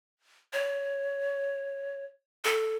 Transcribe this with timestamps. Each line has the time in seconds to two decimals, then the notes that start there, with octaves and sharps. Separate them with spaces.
0.53 C#5
2.45 A4